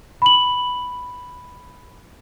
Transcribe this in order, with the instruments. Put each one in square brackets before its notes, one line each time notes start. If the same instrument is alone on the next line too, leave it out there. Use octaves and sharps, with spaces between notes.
[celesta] B5 F#7